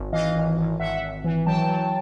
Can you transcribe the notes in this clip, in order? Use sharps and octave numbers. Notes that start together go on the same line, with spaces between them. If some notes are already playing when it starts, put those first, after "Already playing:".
Already playing: G#1
E3 D#5 F5
G#1
G#1
G#1 E5 F#5
G#1
E3
F#3 G5 A5
F#3